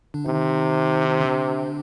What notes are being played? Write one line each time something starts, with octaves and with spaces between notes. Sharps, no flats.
D3 D4
C3 D#3 D#4
D#4
D3 D4